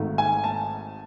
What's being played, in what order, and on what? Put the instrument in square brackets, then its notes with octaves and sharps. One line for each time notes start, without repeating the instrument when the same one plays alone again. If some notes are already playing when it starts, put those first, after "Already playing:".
Already playing: [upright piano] G#1 G#2 D#3 A3
G#5
A5